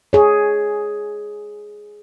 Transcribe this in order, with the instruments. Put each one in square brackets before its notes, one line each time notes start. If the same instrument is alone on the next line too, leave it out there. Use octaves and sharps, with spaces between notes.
[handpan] G#4 C#5